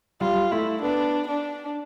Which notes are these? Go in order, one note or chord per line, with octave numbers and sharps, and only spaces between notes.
G3 F4
A3 E4
B3 D4
D4